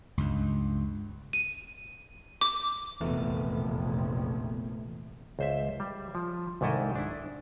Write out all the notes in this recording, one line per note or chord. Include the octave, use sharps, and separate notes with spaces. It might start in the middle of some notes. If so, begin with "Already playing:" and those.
C#2 G2
D#7
D6
F1 A#1 E2 B2 E3 A3
C#2 C5 E5
G3
F3
C2 G#2 D#3 E4 A4 D#5
D4 E4